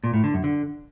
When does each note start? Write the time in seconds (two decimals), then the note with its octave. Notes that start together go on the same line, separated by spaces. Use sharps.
0.04 A#2
0.14 A2
0.24 D3
0.34 F#2
0.44 D3